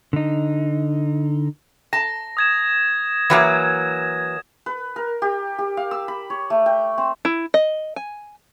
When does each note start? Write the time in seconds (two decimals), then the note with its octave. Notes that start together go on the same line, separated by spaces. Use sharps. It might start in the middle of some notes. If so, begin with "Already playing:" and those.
0.13 D3 D#4
1.93 A5 A#6
2.37 D#6 G#6 E7
3.30 E3 F#3 A#3
4.66 B4
4.96 A#4
5.22 G4
5.58 G4
5.77 F5
5.91 E6
6.08 B5
6.30 C#5
6.50 A3
6.66 G5
6.98 C4
7.25 E4
7.54 D#5
7.96 G#5